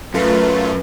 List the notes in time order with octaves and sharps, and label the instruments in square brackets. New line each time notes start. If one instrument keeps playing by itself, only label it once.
[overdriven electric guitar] F#2 [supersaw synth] A3 F4 [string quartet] B4